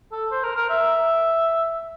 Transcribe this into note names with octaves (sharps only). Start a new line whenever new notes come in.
A4
C5
A#4
A#4
E5